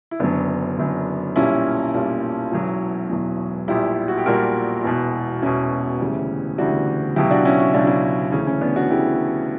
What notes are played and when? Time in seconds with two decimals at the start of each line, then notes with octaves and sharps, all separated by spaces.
0.11 E4
0.20 F#1 F#2 D3 F#3 B3 D4
0.78 F#1 F#2 D3 F#3
1.36 B1 A#2 G3 C#4 E4
1.94 B1 A#2 G3
2.52 E1 E2 B2 F#3
3.10 E1 E2 B2 F#3
3.68 A#1 A#2 G3 E4 G4
4.08 F#4
4.17 G4
4.26 A#1 A#2 G3 F#4 A#4
4.84 E1 E2 B2
5.42 E1 E2 B2 C#4 E4
6.00 D2 C#3 E3 G3
6.58 D2 C#3 E3 G3 D4 F#4
7.16 C#2 B2 F#3 E4 G4
7.31 D4 F#4
7.45 C#4 E4
7.60 E4
7.74 C#2 B2 F#3 D4
7.87 C#4 E4
8.32 D2 C#3 E3 C#4
8.47 C#4
8.61 B3 D4
8.76 D4 F#4
8.90 D2 C#3 E3 E4 G4